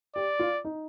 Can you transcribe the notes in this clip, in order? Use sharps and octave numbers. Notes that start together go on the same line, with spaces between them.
G4 D5
F4
D#4